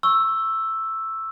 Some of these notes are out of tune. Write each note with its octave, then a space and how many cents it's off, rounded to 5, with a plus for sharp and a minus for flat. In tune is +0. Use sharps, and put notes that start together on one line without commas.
C#6 -10 E6 +0